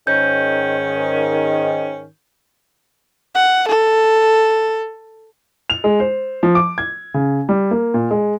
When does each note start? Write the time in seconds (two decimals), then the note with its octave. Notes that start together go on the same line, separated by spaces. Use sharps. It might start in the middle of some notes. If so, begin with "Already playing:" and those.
0.07 G#2 D#3 C#4 G6
3.35 F#5
3.68 A4
5.70 F7
5.84 G#3
6.00 C5
6.43 F3
6.55 D6
6.78 G#6
7.14 C#3
7.49 G3
7.71 A#3
7.94 A#2
8.11 G#3